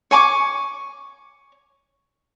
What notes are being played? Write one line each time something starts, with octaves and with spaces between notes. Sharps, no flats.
C#5 G#5 C#6 D6